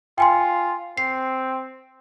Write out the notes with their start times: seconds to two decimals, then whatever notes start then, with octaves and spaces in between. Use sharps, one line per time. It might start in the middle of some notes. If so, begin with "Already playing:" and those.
0.18 F4 G5 G#5 C6
0.97 C4 C7